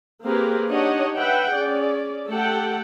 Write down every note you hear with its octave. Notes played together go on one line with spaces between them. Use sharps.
A#3 C4 G4 G#4 A#4 B4
D4 D#4 G4 C#5 D#5 F#5
B4 E5 F#5 G5
C#4 G#4 D5
A3 G4 A4 F#5 G5